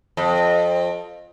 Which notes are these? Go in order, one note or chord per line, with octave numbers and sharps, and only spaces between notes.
F2